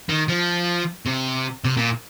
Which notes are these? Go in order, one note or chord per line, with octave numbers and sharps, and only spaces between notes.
D#3
F3
C3
C3
A#2